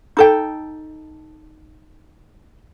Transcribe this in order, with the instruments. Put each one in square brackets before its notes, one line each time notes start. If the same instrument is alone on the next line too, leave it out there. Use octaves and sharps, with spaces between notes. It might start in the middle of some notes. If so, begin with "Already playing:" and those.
[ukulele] D#4 A4 G5